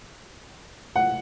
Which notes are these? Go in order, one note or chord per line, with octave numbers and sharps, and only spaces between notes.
F#5